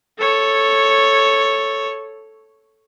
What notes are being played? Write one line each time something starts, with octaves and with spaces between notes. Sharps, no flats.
A4 C#5